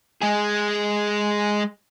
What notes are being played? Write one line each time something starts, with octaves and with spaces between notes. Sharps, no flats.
G#3 G#4